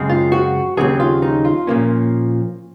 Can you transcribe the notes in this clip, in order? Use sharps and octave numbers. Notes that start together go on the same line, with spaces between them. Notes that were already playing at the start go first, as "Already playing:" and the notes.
Already playing: F#2 C#3 G#3 C4
F4
F#4
D#2 C#3 F#3 C4 G#4
F4
D#4
F4
A#2 F3 A#3 C#4